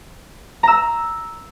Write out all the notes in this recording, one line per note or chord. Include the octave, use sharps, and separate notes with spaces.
A#5 E6